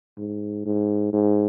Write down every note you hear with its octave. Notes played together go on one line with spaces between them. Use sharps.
G#2
G#2
G#2